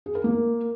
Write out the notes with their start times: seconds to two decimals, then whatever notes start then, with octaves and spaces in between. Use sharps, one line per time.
0.06 G#4
0.15 A#4
0.24 A#3